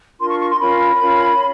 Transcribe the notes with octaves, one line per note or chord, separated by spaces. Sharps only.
D4 F4 A#4 C6
C#6
C#6
C6
C#4 F4 A#4 C#5 B5
C#4 F4 A#4 C#5